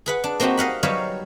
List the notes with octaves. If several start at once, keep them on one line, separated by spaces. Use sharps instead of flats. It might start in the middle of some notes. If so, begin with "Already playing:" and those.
G#4 B4 F#5
D4
A#3 C4 D#4 F#4 G4
D#5 F5 F#5 B5
F#3 G3 D#4 B4 C#5 F5